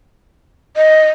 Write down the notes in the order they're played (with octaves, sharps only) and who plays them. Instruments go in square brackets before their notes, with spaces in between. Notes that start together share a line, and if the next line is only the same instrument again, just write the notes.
[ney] D#5